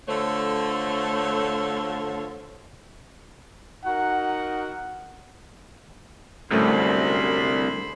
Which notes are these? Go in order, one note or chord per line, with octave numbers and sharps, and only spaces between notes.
D3 A3 F4 A4 C5 C#5
D#4 F#4 A#4 F#5
C2 F#2 D3 G3 A3 C5 B5